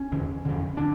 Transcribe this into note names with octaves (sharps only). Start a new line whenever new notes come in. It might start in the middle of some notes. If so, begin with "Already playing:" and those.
Already playing: C#4
E2 D3
F2 D3
D3 D4